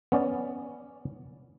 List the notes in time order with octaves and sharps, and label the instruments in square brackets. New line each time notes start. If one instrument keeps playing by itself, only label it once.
[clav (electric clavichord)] B3 C#4 D5